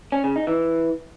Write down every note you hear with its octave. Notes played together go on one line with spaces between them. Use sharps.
C#4
C#3
D#4
E3